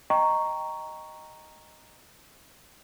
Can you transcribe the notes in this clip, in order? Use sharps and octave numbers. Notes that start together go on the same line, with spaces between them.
D#5 G5 A#5 C#6